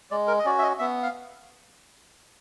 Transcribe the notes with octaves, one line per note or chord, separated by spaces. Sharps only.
G#3 D5
A#4
D#5
C#4 F#4 D5
E5
D#5
B3 E5
F5